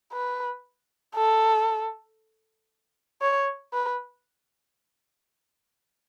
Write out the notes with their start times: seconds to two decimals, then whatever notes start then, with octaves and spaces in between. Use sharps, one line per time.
0.13 B4
1.15 A4
3.22 C#5
3.73 B4